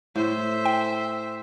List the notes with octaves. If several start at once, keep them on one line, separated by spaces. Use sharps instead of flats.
A2 C5 E5
G5